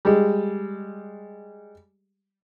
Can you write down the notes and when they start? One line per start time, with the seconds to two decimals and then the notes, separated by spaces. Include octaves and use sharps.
0.05 G3 G#3